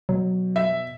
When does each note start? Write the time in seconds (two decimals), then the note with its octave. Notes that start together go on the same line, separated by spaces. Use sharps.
0.09 B2 F#3
0.56 E5